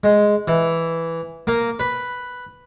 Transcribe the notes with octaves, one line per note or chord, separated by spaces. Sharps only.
G#3
E3
A#3
B4